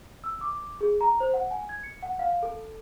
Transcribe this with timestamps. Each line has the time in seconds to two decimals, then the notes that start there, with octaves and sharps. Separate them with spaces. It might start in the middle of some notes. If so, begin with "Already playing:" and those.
0.24 E6
0.41 D6
0.81 G#4
1.01 A#5
1.20 C5
1.34 F#5
1.51 G#5
1.69 G#6
1.83 C#7
2.03 F#5
2.19 F5
2.43 A4